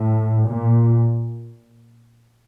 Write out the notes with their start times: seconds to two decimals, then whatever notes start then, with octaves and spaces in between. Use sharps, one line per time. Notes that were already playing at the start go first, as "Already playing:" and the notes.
Already playing: A2
0.49 A#2